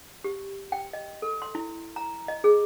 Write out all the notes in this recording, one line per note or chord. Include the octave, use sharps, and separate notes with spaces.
G4
G5
D#5
A4
C6
E4
A#5
D#5
G#4